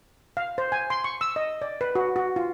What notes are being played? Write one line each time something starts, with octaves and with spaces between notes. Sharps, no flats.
F5
C5
G#5
C6
C#6
E6
D#5
D5
B4
F#4
F#4
F4